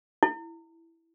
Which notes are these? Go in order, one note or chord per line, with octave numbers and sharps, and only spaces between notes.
E4